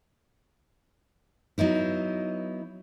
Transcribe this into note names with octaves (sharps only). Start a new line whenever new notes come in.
F#3 B3 D#4 E4